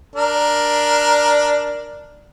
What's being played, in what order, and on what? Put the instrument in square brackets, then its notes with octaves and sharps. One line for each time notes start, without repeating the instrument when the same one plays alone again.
[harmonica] D4 A#4